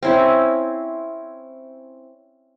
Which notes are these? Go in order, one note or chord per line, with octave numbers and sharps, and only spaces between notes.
C4 C#4 E4